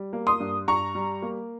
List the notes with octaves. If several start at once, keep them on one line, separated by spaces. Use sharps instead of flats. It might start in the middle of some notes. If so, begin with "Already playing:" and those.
Already playing: G3
A#3
C6 D#6
G2
G2 A#5 C#6
G3
A#3